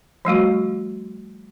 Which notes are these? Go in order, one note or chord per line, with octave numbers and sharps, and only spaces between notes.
F3 G3 A3 F#4